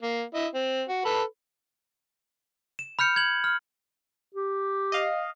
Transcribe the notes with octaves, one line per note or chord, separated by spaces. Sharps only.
A#3
E4 D#5
C4
F#4
A4 B4 B5
E7
B5 F6 G6 C#7
G#6 F#7
F6
G4
D#5 F5